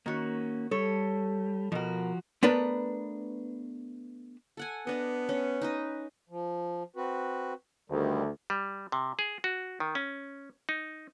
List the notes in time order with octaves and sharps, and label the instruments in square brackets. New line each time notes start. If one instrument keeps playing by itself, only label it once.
[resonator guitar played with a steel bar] D#3 F#4 [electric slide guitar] A#3 C#4
[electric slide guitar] G3 [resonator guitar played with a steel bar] A4 C#5
[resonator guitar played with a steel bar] B2 A#4 [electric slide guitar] F3 F#4
[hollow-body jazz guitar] A3 B3 D4 A#4 B4
[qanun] A4 F#5 G#5
[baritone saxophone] B3 [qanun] D4 D#5
[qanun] C#4
D#4 B4 D#5
[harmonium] F3
C4 F#4 B4
[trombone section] D2 [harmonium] D#3 G3
[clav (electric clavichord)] G3
C3
G#4
F#4
D#3
C#4
D#4